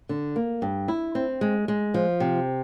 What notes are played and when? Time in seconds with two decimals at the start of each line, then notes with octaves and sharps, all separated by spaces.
0.09 D3
0.36 A#3
0.62 G2
0.88 E4
1.15 C4
1.41 G#3
1.68 G#3
1.94 F3
2.20 C3